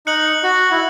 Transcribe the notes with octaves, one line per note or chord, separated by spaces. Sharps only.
D#4 F#6 C#7 F#7
F#4
E4